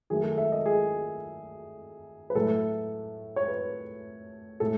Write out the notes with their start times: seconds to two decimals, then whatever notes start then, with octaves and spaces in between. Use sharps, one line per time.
0.10 D#3 F#3 A3 G#4
0.24 A4
0.38 E5
0.52 D#5
0.66 G#4
2.30 B4
2.35 A2 F#3 A3 A4
3.36 C#5
3.48 B4
4.60 A2 G#3 A4